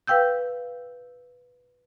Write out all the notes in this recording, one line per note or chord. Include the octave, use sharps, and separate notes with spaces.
B4 F5 G5 E6 G6